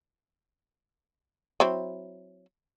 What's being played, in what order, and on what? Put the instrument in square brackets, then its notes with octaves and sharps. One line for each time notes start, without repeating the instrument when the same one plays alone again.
[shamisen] F#3 C4 E4